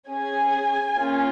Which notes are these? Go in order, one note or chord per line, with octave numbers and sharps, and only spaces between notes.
C#4 G#4 G#5
A#3 C#4 F4 G#4